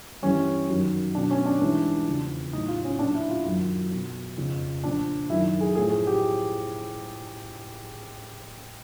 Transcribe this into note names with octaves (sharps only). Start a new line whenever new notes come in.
G2 E3 G3 C#4
F#2 D#3 F#3
B2 F#3 D4
C#4
D4
G#2 E3 G3
E2 C#3 F3
A2 F#3 D#4
F4
C#4
A#2 F#3 D4
E4
F4
F#2 D#3 F#3 F4
B2 F#3
F2 C#3 F3
A#2 F3 D4
F#2 D#3 F#3 E4
G#4
A2 F3 G#4
G#4
G4